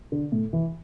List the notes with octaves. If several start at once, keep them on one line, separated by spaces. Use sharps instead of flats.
D3
A2
E3